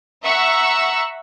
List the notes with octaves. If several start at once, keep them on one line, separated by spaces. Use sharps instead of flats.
E5 F#5 A#5 C#6 E6